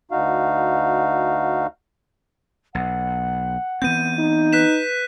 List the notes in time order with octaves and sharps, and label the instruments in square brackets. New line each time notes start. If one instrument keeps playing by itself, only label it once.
[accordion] D2 D#4 F#4 F5
[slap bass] B1 [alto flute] F#5
[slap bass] E3 B3 C4 [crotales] G6 D#7
[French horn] D#4
[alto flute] B4 [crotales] F#6 B6 E7